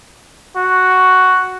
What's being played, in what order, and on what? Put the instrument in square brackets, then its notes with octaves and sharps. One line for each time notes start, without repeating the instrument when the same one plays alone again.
[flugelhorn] F#4